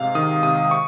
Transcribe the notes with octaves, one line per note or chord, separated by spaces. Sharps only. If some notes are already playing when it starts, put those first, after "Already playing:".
Already playing: G#2 C3 F5
D#3 D#6
C3 D#6
C#6